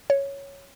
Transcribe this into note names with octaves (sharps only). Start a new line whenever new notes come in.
C#5